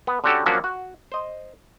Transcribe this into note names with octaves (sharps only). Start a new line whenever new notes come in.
B3
D3 C#4 F#4 G4 A4
F3 F#3 A#3 C#4 D4 F#4
F#4
C5 D#5